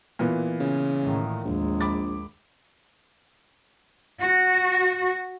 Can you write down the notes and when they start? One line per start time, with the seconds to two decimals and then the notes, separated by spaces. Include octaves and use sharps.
0.19 A#2 E3 B3
0.60 C#3
1.03 A2 D#3
1.45 A#1 D#2 G#3
1.81 B5 D6 A6
4.21 F#4